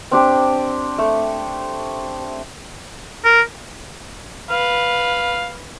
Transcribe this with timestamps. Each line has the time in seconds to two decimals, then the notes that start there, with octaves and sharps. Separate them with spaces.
0.12 C4 D4 G4
0.98 A3
3.25 A#4
4.50 B4 F5